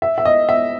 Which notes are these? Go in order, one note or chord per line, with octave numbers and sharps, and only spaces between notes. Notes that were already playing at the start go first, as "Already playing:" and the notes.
E5
E5
D#5
E5